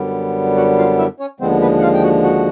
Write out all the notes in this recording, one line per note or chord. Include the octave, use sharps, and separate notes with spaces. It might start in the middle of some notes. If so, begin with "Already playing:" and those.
Already playing: F#2 D3 G3 B3
F#4 F#5
F4 F5
E4 E5
C#4 C#5
D#2 D3 F3 G#3 B3 C4 C5
B3 B4
F#5
F4 F5
G5
F#4 F#5
F#4 F#5